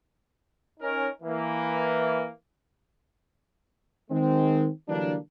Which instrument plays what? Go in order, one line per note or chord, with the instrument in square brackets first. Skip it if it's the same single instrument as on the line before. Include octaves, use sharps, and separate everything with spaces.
[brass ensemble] C#4 D#4 A#4
E3 A#3
D#3 G#3 C4
D3 E3 F#3 G3 A#3 D4